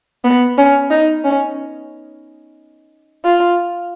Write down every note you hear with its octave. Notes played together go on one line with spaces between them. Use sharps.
B3
C#4
D#4
C#4
F4